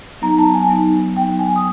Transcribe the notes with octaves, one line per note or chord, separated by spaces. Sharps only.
F#3 B3 D#4 A#5
A5
G#5
F#3 B3 D#4
F#3 B3 D#4 G5
G#5
D#6